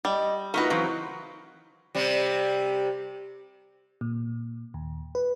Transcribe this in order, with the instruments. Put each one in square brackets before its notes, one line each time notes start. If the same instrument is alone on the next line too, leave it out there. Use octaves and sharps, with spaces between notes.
[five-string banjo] G3 [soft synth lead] D#5
[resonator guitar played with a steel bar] A3 D#4 F#4 [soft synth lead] F4 [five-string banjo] A#4 B4
[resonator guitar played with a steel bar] C#3 F#3 C4 [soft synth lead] E3
[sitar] C3 G3
[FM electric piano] A#2
D#2
B4